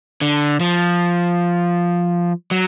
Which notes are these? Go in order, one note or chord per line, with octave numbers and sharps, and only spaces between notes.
D3
F3
F#3